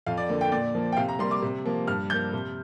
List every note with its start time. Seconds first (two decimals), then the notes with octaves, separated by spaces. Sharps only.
0.07 F2 F5
0.17 D5
0.29 D3 A#3
0.41 G5
0.52 A#2 D5
0.75 F3 A#3
0.93 G5
0.97 C3 F5
1.08 A#5
1.19 G3 A#3 C6
1.31 D6
1.42 C3
1.65 F3 A#3
1.87 G2 F6
2.10 F3 A#3 G6
2.33 C3